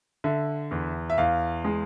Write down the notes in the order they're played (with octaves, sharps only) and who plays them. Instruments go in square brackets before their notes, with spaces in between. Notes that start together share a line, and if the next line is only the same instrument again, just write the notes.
[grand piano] D3 [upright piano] E5
[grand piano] E2
[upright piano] E5
[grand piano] E2 [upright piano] F5
[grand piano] G#3